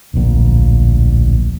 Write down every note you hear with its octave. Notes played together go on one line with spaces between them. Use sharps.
D1 A#1